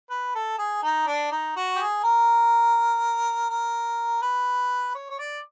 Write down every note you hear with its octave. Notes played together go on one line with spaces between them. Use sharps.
B4
A4
G#4
D#4
D4
D#4
F#4
G4
G#4
A#4
A#4
B4
C#5
C#5
D5